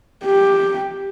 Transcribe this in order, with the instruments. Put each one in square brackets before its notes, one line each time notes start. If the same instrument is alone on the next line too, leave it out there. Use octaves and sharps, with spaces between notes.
[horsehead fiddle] G4